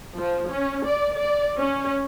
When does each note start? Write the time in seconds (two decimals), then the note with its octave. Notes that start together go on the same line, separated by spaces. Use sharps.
0.17 F3
0.50 C#4
0.87 D5
1.17 D5
1.58 C#4